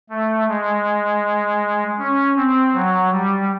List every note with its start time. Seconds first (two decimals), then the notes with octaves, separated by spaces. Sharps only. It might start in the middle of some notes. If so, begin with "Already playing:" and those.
0.10 A3
0.49 G#3
1.99 C#4
2.36 C4
2.74 F#3
3.10 G3